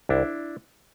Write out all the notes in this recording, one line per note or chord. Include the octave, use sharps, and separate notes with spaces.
C2 D4 E4